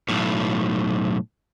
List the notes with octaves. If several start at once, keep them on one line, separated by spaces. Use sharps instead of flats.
B1 A2